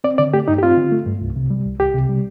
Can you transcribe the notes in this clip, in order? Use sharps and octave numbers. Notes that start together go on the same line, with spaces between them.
C4 D5
D3 D5
A3 G4
G2 D#4
G4
C4 F4
D3
A3
G2
C2
C3
G3
C2
C2 G4
C3
G3